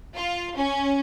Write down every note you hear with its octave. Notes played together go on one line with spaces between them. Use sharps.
F4
C#4